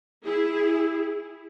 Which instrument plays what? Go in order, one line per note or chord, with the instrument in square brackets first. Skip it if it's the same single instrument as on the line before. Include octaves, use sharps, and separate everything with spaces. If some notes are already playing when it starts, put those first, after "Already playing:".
[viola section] E4 G#4